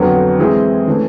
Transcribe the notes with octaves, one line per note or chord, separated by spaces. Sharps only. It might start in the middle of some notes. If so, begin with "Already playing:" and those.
Already playing: F2 D3 F#3 B3
E3 G#3 C4 E4 G#4
E3 A3 C#4